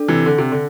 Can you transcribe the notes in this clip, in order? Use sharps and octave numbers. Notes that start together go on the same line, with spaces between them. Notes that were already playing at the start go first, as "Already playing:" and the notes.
Already playing: D4 A4 D5
C3 E3
D3
C3
D3